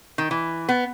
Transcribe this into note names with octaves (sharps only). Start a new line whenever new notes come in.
D#3
E3
B3